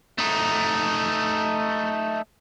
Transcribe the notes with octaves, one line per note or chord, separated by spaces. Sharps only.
A3 D#4